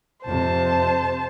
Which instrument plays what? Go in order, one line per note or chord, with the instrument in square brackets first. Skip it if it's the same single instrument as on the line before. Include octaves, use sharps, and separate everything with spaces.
[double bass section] F2 C3 [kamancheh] C5 A5